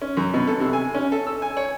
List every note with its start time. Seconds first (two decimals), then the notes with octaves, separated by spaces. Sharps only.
0.02 C#4
0.17 F#2
0.34 B2
0.47 A4
0.60 C3
0.73 G#5
0.95 C#4
1.12 A4
1.27 E6
1.42 G#5
1.57 C#5